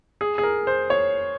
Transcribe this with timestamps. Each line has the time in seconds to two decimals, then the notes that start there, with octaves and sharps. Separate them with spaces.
0.21 G#4
0.38 G#4
0.43 A#4
0.67 C5
0.90 C#5